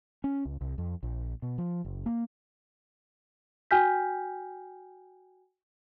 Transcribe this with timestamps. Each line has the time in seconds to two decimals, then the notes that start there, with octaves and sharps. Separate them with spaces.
0.24 C#4
0.45 C#2
0.61 C2
0.78 F2
1.03 A#1
1.42 B2
1.58 F3
1.85 F#1
2.06 A#3
3.71 F#4 G5 G#5 F6 G6 B6